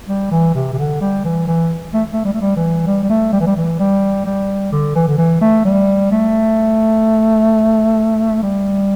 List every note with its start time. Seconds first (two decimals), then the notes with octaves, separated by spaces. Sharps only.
0.08 G3
0.31 E3
0.55 C3
0.73 C3
0.78 D3
1.01 G3
1.25 E3
1.47 E3
1.94 A3
2.13 A3
2.25 G3
2.33 A3
2.41 G3
2.56 E3
2.87 G3
3.03 G3
3.10 A3
3.33 G3
3.40 E3
3.47 G3
3.56 E3
3.79 G3
4.26 G3
4.72 D3
4.95 E3
5.08 D3
5.18 E3
5.41 A3
5.65 G3
6.11 A3
8.43 G3